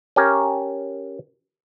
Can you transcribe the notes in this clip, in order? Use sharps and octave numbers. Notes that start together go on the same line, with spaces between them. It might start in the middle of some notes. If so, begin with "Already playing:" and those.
C#4 G4 A#4 C#5